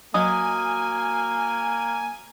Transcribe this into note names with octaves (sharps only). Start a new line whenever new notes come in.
F#3 A#3 D#5 G#5 D#6